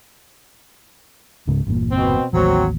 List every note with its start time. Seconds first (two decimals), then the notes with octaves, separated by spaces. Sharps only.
1.47 C#2 G#2 C#3
1.66 G1 E2 A#2
1.92 B2 C4
2.33 A1 D#2 F#3 C4